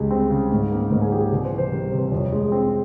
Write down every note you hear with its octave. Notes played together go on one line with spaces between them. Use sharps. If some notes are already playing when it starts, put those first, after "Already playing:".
Already playing: C#2 G3 G#3 G#4
C4
C#3
G#2
A#3
G#2 A#4
G#4
F3 G4
G#4
C2
C5
E3
C5
G3 A#4
A#4
C3
C5
F2 C#5
G#3
C4